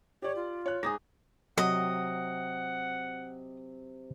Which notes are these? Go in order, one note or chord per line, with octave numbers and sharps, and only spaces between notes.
G4 C#5 D5
F4
C#5 F#6
G#2 D#4 G#4 A#6
C3 F#3 D#5 F#5